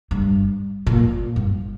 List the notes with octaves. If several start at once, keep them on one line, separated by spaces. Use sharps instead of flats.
G2
A#2
G2